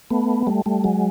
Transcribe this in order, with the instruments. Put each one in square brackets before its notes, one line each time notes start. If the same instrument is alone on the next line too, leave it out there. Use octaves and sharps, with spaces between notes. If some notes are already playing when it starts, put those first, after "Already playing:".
[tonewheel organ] A3 B3
G3 A3
G3 A3
F#3 G#3